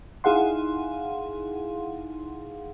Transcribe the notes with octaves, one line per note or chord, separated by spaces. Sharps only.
D#4 E4 G#4 F5 F#5 C6